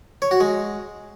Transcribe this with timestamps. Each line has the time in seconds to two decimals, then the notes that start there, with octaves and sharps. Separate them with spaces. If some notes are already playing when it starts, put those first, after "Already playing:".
0.22 C#5
0.31 F#4
0.40 G#3